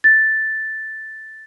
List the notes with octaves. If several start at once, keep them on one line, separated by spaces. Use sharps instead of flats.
A6